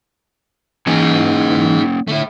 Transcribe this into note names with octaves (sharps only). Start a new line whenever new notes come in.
E3 A#3 C#4 D#4 G#4 G#5
D3 A3 E4